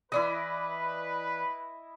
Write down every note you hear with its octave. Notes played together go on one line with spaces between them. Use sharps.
E3 E4 B4 D5 D#5